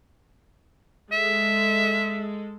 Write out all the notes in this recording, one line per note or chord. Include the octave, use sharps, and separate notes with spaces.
G#3 A4 E5